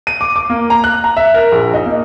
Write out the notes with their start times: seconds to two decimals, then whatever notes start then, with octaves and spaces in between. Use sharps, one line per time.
0.07 D#7
0.21 D6
0.36 D6
0.50 A#3
0.70 A#5
0.84 F#6
1.04 A#5
1.17 E5
1.34 A#4
1.52 A#1
1.74 D#4
1.86 A#3